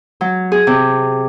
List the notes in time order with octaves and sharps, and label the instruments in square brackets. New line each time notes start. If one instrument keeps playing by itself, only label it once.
[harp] F#3
G#4
C3